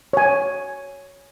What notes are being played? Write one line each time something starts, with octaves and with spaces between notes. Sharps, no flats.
C#5 G#5